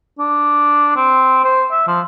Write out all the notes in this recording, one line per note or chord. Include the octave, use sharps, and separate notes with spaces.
D4
C4
C5
E5
F3